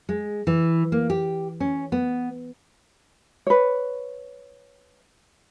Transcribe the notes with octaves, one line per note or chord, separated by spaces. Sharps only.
G#3
E3
A#3
G4
C#4
B3
B4 C#5